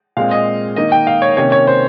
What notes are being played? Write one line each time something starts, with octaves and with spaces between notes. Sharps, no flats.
A#2 G#3 C4 F5
D#5
D#3 A#3 D#4 D#5
G5
F5
C#5
C3 D#3 A#3 C#4 C#5
C#5
C5